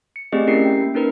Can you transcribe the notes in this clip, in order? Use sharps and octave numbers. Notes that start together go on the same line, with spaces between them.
C#7
A3 C4 G4 G#4 D5 D#5
C#4 E4 G4 A#4 C7 C#7
G5
A#3
C#4 D#4 A#4 B4